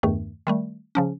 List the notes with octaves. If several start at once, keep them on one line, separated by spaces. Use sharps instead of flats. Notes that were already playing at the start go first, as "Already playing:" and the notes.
E2 G2 D#3 A3
D#3 G3 A3
C#3 F3 C#4